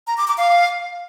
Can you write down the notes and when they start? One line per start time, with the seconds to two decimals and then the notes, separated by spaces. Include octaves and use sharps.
0.07 A#5
0.18 D6
0.28 D6
0.38 F5